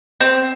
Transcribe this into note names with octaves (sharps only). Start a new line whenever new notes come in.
C4